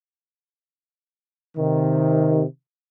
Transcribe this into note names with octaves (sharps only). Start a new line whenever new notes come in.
C3 D#3